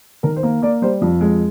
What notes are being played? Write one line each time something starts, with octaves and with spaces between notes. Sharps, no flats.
D#3 A#4
C5
A#3
A#3 D5
G3 C5
F2
G#3